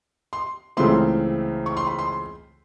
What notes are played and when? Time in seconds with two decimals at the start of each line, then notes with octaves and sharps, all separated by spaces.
0.33 C6
0.77 C#2 C#3 E3 A3 C4 C6
1.66 C#6
1.77 C6
1.87 B5
1.99 C6